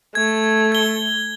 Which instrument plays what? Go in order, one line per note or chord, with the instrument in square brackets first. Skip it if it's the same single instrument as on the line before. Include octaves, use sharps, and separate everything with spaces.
[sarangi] A3 [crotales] G#6
[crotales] G#6 G7